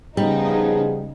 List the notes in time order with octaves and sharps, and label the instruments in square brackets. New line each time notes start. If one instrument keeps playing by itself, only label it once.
[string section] C#3 D#4 [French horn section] F3 B3 G#4 [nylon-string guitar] G3